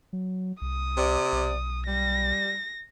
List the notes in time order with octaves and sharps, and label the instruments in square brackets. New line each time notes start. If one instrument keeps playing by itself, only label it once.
[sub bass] F#3
[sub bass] C2 [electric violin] D#6
[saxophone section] C3 D5
[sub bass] B1
[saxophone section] G3 [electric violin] A#6